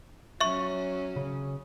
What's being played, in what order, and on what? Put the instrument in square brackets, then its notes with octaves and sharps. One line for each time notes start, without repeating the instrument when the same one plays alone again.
[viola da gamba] F#3 C#4 [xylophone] E5 C#6
[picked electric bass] C#3